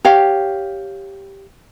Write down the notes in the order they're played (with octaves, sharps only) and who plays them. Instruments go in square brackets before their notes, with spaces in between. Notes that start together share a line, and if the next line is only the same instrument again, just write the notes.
[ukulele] G4 C#5 F5